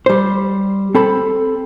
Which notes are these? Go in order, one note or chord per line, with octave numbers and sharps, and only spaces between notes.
G3 C5
C4 A4 B5